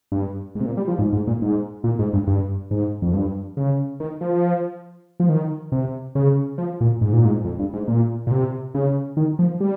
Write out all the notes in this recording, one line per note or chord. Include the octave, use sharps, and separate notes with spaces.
G2
G#2
C3
A#2
G3
F3
G#2
G#2
A#2
G#2
A#2
G#2
G2
G2
G#2
F2
G2
C#3
D#3
F3
F3
D#3
C3
C#3
F3
A#2
G#2
A#2
G#2
F2
G2
G#2
A#2
A#2
C3
C#3
D#3
F3
G3